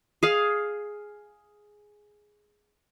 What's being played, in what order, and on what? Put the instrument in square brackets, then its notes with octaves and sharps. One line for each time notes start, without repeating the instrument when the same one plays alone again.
[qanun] G#4 F5